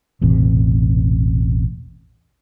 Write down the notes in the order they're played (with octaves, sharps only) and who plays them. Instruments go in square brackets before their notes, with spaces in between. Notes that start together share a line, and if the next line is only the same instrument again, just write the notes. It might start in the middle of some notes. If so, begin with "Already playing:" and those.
[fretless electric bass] E1 A1 C3